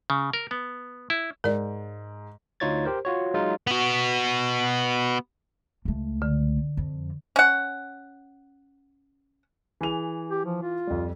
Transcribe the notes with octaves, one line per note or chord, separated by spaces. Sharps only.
C#3
A#4
B3
E4
G#2 A#4 D5
D2 D#4 F4 C#5 G#6 A6
G4 A#4 C5
F4 F#4 C#5
F#3 G#3 D#4 F4
B3 F#4
C#2 A3
D3
F2
C#4 F#5
E3 G#4 F7
G4
F3
F4
F2 G3